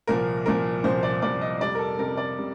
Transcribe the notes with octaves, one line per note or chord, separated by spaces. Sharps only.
C2 A#2 F3 A#4
C2 A#2 F3 A#4
C2 A#2 F3 C5
D5
C2 A#2 F3 D5
D#5
F2 C3 G3 D5
A#4
A4
F2 C3 G3 A#4
D5
C3 G3